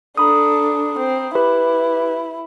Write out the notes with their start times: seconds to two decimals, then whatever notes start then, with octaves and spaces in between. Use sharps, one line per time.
0.17 D4 A4 A#5 B5 D#6
0.98 C4
1.35 E4 G4 B4 B5